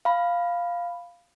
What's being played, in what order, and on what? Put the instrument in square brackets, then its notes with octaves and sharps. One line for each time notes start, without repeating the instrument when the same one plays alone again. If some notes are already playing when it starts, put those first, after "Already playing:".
[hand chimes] F5 B5